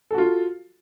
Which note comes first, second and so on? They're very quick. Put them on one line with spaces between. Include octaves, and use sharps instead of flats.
A4 F#4 F4